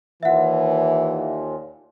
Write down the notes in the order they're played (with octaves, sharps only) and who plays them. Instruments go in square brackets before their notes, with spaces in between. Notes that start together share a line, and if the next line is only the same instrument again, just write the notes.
[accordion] D#2 A#2 [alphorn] E3 [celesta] E5 F#5